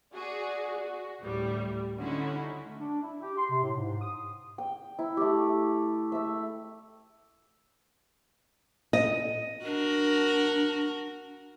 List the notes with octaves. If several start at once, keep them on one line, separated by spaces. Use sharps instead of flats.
F#4 G#4 D5
F#4
D2 A2 G3
D3 C#4 D#4 E4 F#4
A3
D4
E4
G4
C6
C3
A2
G#2
D#6
G5
E4
A3 G4
A3 E5
D#5
D4 F#4 A#4